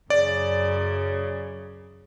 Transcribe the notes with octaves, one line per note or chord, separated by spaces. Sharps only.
F#2 C#3 D5